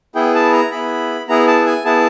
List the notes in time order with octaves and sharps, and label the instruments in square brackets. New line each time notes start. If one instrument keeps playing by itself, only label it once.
[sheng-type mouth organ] B3 E4 G#4 G5
A5
A#5
B3 E4 G#4 B5
B3 E4 G#4 A#5
A5
G#5
B3 E4 G#4 A5